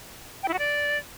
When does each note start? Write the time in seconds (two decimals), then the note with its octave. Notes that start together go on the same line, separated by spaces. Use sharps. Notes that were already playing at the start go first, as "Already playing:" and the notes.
0.43 G5
0.48 E4
0.53 F#4
0.59 D5